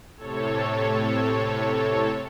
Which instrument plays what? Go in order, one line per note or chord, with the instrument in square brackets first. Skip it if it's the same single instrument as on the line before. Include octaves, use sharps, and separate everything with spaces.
[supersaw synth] A2 C3 A4 C#5